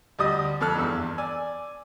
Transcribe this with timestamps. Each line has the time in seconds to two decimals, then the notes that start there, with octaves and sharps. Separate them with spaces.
0.19 D2 G3 D#5 D#6
0.61 F2 A4 F6 F#6
0.75 E2 G2 E6
1.18 D5 G#5 E6